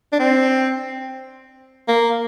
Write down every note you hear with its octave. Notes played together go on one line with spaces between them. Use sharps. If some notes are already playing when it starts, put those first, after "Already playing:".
D4
C4
A#3